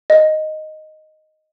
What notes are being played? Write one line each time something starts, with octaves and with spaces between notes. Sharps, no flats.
D#5